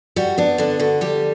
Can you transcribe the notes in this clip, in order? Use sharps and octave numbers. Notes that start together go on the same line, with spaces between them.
G3 F#4
B3 D4
D3 D4
D3 F#4
G3 G4